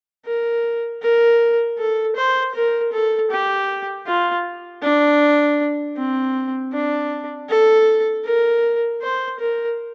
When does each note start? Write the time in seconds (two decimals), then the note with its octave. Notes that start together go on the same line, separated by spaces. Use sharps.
0.26 A#4
1.02 A#4
1.78 A4
2.16 C5
2.55 A#4
2.92 A4
3.31 G4
4.07 F4
4.83 D4
5.97 C4
6.73 D4
7.49 A4
8.25 A#4
9.02 C5
9.40 A#4